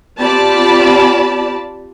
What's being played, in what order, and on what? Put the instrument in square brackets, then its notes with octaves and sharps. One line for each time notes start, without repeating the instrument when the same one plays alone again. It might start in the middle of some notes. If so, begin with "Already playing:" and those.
[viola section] C4 F4 G4 D5 A5 B5